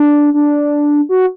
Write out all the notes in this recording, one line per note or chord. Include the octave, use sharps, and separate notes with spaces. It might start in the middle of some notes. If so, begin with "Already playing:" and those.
Already playing: D4
D4
F#4